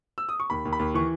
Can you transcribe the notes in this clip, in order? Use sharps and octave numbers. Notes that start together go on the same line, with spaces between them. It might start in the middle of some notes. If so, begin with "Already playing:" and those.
E6
D#6
C#6
D#2 B5
D#2
B5
D#2
E3 C#6